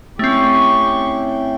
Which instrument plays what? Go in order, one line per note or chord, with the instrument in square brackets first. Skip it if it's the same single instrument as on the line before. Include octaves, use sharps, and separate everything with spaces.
[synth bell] A3 C4 [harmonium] C#4 E4 G5 [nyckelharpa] G4 C#6